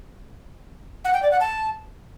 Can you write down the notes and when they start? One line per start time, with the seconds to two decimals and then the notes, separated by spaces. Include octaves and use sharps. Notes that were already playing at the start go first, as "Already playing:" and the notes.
1.05 F#5
1.14 G5
1.22 D5
1.31 F#5
1.40 A5